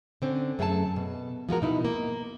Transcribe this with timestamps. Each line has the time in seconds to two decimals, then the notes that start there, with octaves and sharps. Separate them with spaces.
0.22 D3 C4 C#4
0.59 F#2 A3 G#4 A4 G5 A5
0.96 B2
1.49 F3 G#3 F#4 A#4
1.62 B2 D#4 E4
1.85 A#3